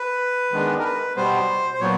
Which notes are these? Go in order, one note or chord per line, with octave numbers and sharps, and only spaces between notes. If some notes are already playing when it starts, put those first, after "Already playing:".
Already playing: B4
D#3 G#3 B3 D4
A#4
B4
B2 G3 B3 C5
C5
A#2 F#3 B3 C#5